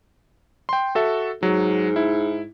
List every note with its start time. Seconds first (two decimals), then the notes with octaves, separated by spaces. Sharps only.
0.69 G5 C6
0.95 F#4 A4 E5
1.43 G#2 F#3
1.96 E4